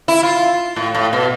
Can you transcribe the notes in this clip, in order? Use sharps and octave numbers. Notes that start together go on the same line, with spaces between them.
E4
F4
A2
A2
B2